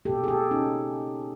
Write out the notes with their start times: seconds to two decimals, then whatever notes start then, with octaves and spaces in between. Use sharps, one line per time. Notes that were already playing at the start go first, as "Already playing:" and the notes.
0.05 B2 G3 A#3 G4 A4
0.24 G#4
0.28 G4 A4
0.51 C#4 D#4